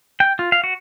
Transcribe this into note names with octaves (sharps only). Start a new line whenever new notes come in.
G5
F4
F5
F#4